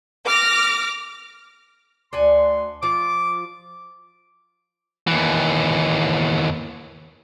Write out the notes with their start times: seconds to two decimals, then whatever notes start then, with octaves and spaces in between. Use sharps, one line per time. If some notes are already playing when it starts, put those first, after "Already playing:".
0.25 D6 F6 A#6
2.13 D2 D4 F#5 G#5 C6
2.83 F3 F4 D6
5.07 D#2 E3